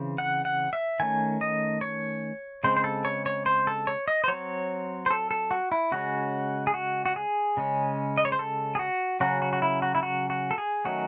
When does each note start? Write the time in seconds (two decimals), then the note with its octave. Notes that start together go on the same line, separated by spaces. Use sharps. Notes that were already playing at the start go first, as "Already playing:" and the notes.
Already playing: C#3 E3 C4
0.18 F#5
0.45 F#5
0.73 E5
1.00 D#3 A3 C#4 G#5
1.41 D#5
1.81 C#5
2.64 C#3 G#3 C4 C5
2.77 C5
2.84 A4
3.05 C#5
3.26 C#5
3.46 C5
3.67 A4
3.87 C#5
4.08 D#5
4.24 C5
4.28 F#3 C4 C#5
5.06 C5
5.11 A4
5.31 A4
5.51 F#4
5.72 E4
5.92 C#3 G#3 C#4 F#4
6.67 G#4
6.74 F#4
7.06 F#4
7.16 G#4
7.57 C#3 G#3 C#4
8.18 D#5
8.25 C#5
8.32 C5
8.39 A4
8.75 G#4
8.79 F#4
9.20 C#3 F#3 C#4 F#4
9.42 F#4
9.53 F#4
9.62 E4
9.82 F#4
9.95 E4
10.03 F#4
10.30 F#4
10.51 A4
10.58 G#4
10.85 D#3 F#3 A3 C#4 F#4